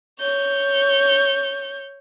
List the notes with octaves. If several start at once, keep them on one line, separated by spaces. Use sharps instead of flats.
C#5 G6